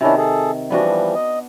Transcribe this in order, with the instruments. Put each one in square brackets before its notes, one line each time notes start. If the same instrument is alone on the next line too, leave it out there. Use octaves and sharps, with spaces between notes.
[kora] C3 D#3 [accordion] C#4 D4 E4
[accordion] G#4 A4
[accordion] E3 F3 G3 [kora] B3 D4 F#4
[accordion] D#5